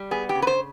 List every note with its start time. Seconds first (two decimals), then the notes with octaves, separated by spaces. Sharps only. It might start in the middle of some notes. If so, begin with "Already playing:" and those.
Already playing: G3
0.11 B3 G#4
0.29 G4
0.35 C#3
0.42 B4
0.47 C5